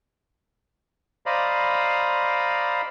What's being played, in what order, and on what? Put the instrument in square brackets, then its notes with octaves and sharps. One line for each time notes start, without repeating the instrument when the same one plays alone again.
[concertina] C5 D5 D#5 F5 A#5 B5